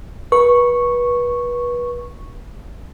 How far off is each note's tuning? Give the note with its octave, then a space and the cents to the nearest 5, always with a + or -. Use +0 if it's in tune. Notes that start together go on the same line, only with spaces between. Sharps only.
B4 -25 C#6 -5